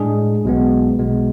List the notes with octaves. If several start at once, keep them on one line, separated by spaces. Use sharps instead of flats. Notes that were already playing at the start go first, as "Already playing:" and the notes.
Already playing: A2 G#3 D4 G#4
B1 B2 G#3 B3
B1 B2 G#3 B3